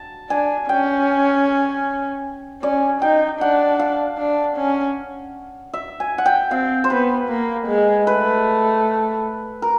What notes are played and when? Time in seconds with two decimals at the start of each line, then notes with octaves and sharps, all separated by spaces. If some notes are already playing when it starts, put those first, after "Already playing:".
Already playing: A5
0.30 D4 G#5
0.69 C#4 G5
2.63 C#4 D5
3.02 D#4 G5
3.40 D4 F#5
3.79 F5
4.18 D4
4.57 C#4
5.73 E5
6.00 G#5
6.18 F#5
6.26 G5
6.51 C4 F5
6.84 C5
6.90 B3 B4
7.29 A#3
7.67 G#3
8.07 A3 B4
9.62 A#4